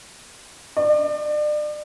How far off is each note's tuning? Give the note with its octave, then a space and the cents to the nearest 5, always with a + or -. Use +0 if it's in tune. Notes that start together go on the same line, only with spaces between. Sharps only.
D5 +35